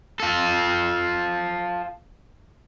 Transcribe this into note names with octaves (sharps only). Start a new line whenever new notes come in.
F4 A4